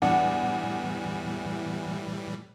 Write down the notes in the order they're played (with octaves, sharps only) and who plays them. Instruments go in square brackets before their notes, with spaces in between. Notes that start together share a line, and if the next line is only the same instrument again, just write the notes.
[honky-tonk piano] E2 [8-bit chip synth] A2 E3 G3 [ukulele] D4 F#5